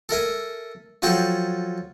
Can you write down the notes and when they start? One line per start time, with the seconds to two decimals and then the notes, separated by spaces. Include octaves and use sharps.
0.09 A4 A#4 E5 G#5
1.02 F3 F#3 G#4 A4 G5 A5